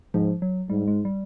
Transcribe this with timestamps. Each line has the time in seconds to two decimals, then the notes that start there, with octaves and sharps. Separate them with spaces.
0.14 G#2 F3
0.42 F#3
0.70 G#2 G3
0.88 G#3
1.05 G3